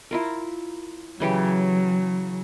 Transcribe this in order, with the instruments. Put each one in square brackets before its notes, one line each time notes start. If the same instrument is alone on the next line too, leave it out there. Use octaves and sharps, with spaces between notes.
[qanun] E4 F4 A#4
[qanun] C#3 E3 G4 [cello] F#3